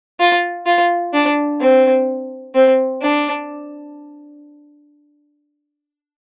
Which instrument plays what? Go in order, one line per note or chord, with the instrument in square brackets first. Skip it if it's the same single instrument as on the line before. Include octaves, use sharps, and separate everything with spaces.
[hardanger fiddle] F4
F4
D4
C4
C4
D4